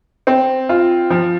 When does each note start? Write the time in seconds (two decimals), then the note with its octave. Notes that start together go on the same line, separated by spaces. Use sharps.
0.27 C4
0.69 F4
1.10 F3